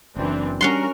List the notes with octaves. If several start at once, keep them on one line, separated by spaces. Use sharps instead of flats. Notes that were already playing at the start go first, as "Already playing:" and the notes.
F#1 F#2 E3 C4 D4
G3 C#4 D4 F#4 A#4 F#5 C6